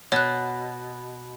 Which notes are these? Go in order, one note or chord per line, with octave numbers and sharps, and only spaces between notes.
B2 C#5 F#6